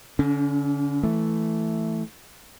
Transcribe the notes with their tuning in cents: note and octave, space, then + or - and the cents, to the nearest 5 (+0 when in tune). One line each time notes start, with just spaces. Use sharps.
D3 -30 C#4 +25
E3 +0 A3 +0